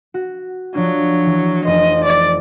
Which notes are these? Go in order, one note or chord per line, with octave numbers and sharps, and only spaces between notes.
F#4
F3 F#3 D4
E3
F1 C5 D#5
D5